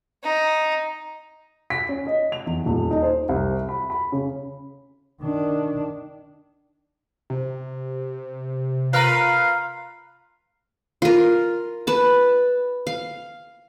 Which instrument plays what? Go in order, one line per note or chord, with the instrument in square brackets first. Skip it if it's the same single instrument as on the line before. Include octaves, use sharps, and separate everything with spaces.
[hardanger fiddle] D#4
[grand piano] B6
C#4
D#5
F7
E2
D#1
D#4
C5
C2
B5
B5
C#3
[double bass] D#3 D4
[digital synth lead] C3
[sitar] F4 A#4 B4 [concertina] F5 [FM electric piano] A#5 F6 F#6
[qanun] F4 A#4
B4 A5
F5